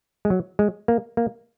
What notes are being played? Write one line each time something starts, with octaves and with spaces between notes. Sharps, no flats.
G#3
F#3
G#3
A#3
A#3